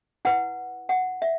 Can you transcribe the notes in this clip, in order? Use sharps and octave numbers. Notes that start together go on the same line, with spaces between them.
E4 B4 F#5
F#5
E5